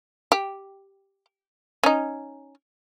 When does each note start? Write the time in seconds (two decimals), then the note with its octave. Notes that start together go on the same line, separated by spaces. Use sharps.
0.32 G4
1.84 C#4 D#4